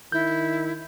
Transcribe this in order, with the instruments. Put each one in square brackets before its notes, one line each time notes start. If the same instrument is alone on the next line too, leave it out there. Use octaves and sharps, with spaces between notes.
[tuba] D#3 [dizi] E4 [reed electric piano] G6